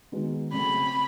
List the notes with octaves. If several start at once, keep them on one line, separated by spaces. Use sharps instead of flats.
D#3 G#3 B3 D#4 F#4
C#3 F#3 A3 C4 B5